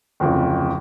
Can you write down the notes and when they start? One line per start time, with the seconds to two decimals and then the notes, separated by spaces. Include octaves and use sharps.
0.20 D1 F2 C#3